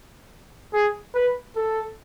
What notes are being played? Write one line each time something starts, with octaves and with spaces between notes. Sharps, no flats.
G#4
B4
A4